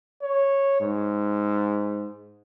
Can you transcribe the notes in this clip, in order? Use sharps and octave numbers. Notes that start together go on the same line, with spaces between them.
C#5
G#2